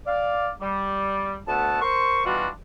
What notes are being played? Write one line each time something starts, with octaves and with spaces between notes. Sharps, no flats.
D5 F5
G3
D2 A3 B3 F#5 A5
A#4 C5 C6 C#6
B2 E3 G3 D4 F4 F#4